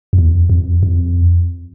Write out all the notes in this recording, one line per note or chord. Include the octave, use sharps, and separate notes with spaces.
F2
E2
F2
F2